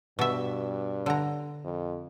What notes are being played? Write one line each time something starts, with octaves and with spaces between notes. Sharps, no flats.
G2 B2 E5
D3 A#5
F2